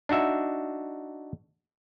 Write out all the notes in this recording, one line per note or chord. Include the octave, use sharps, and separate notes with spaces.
D4 D#4 F#4 E5